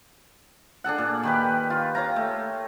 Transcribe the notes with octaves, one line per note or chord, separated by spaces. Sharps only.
D4 G#4 A4 F#5
A#2
D#3 G4 B4
F4
C#5 F5 A#5
A3